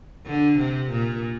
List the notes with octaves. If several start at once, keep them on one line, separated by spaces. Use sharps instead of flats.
D3
C3
A#2